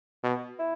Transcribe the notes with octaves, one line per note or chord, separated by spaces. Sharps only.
B2
E4